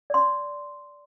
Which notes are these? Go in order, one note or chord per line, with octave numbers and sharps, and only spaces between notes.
D5 C6